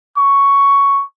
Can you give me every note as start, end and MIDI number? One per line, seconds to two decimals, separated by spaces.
0.18 1.04 85